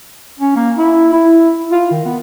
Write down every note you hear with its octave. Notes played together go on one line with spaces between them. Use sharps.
C#4
A#3
E4
E4
F4
D#3
B3